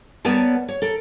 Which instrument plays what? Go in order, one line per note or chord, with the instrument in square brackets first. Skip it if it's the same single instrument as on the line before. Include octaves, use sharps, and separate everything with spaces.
[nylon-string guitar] G3 B3 A#4 C#5 A5
C#5
A4 A#4